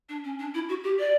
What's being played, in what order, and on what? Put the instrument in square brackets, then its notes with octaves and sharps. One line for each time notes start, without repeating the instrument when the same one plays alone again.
[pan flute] D4
C#4
D4
E4
F#4
G4
D5